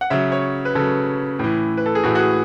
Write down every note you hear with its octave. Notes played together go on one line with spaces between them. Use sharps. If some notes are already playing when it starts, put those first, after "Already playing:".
F#5
C#3 F#3 E5
C#5
B4
C#3 F#3 A4
A2 E3
B4
A4
G#4
A2 E3 F#4
F#4
G#4